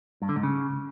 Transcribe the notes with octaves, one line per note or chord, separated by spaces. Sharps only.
G2
D3
G#2
C#3